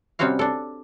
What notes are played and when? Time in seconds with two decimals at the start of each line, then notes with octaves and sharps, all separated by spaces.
0.19 C3 G3 C4 C#4 F#4 F5
0.39 D4 A4